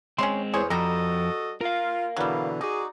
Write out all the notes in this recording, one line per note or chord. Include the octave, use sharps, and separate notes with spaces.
G#3 C4 C#4 C#5 C6
E2 G#4 C5 C#5
F2 F3 G3 F#4 A4 D#5 A#5
F4 A#4 F5
B2 D3 E3 F#3 G3
D#4 F#4 G#4 D5